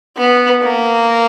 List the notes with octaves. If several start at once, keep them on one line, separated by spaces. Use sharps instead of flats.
B3
A#3